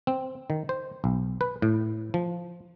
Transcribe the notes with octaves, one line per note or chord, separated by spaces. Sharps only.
C4
D#3
C5
B1
B4
A2
F3